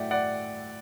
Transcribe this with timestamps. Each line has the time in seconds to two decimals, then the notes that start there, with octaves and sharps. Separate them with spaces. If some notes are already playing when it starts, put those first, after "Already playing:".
Already playing: A2 F#3 A3 D5 E5 F#5 G5
0.11 D5 F#5